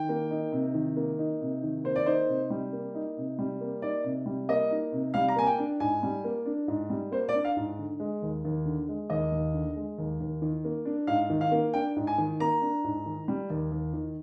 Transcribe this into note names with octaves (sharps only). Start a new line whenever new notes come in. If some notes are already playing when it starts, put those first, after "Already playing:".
Already playing: D#3 G5
A#3
D#4
C3
D#3
A#3
D#4
C3
D#3
A#3 C5
D5
D#4 C5
C3
G3
A#3
D#4
C3
G3
A#3
D#4 D5
C3
G3
A#3 D#5
D#4
C3
G3 F5
A#5
A#3 G#5
G5
D4
G#2 G#5
G3
A#3
D4
G#2
G3
A#3 C5
D5
D4
F5
G#2
D3
G#3
D#2
D#2
D3
G#3
D#2 D#5
D#2
D3
G#3
D#2
D#2
D#3
A#3
D4
G#2 F5
D#3
F5
A#3
D4 G5
G#2
G#5
D#3
A#3 A#5
D4
G#2
D#3
G3
D#2
D#2
D#3